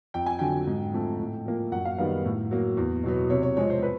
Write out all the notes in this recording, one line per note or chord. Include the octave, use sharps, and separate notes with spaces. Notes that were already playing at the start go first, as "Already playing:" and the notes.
F2 G5
G#5
D3 F#3 G5
G#2
F3 A3 C4
A2
F3 A#3
F#2 F#5
F5
D#3 G3 B3 F5
A2
F#3 A#3
E2
B2 F#3 B3
C3 C#5
C#5
F3 G#3 C4 C#5
C5
B4